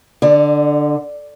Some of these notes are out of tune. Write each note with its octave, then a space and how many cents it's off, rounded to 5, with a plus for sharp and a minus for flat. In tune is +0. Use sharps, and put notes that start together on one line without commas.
D3 +5 D5 +40